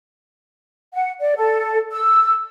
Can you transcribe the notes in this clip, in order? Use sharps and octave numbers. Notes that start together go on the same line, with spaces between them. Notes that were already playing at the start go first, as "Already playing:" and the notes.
F#5
D5
A4
E6